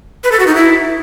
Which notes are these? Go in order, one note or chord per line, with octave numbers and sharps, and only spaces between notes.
B4
A4
F#4
D#4
E4